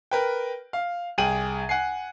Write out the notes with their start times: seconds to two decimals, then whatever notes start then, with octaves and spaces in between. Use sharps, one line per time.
0.11 A#4 B4 G5
0.73 F5
1.18 C2 G#4 G5 D#7 F#7
1.69 F#5 G#5 C7